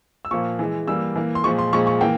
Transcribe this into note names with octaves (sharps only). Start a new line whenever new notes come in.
E6
A#2 F3 A#3 C#6
E3 G#3
E3 G3 A#3 E6
E3 A#3
C6
A#2 F3 G#3 C#6
C6
A#2 F3 G#3 C#6
C#6
E3 A#3 G5